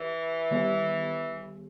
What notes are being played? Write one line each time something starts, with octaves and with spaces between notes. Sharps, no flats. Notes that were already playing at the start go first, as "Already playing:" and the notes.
Already playing: E3 G4
D#3 G3 B3 G4